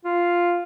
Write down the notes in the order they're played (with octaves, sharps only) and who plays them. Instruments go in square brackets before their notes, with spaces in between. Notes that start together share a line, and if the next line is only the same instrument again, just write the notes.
[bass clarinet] F4